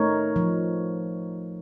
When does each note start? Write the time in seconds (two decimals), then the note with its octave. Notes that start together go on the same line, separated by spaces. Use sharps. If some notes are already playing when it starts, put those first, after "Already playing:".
Already playing: A3 D#4 A#4 C#5
0.36 F3